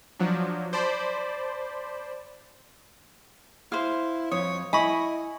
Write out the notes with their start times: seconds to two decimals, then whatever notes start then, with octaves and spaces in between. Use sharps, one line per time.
0.19 F3 F#3 D4
0.73 C5 D5 A5 B5
3.72 E4 C5 F5
4.32 F2 C#5 D#6
4.73 E4 D#5 G#5 B5 C#6